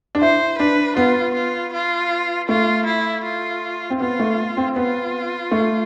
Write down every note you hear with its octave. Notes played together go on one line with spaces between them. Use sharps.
D4
E4 C5
D4 B4
B3 F4
F4
F4
A3 F4
E4
F4
C4
B3 F4
A3
C4
B3 F4
A3